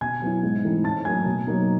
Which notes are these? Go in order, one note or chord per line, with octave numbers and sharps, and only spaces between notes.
B2 G#5 G#6
F#3 B3 E4
G#2
E3 A3 C4 D#4
A2 A5 A6
F#3 A#3 G#5 G#6
B2
F#3 A#3 D#4